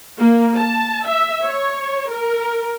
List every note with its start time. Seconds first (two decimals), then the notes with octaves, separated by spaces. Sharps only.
0.18 A#3
0.57 A5
1.06 E5
1.45 C#5
2.10 A#4